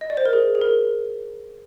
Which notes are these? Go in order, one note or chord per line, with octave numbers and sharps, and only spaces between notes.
D#5
D5
C5
A#4
G#4
G#4
A#4